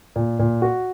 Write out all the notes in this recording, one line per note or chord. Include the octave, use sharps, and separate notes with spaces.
A#2
A#2
F#4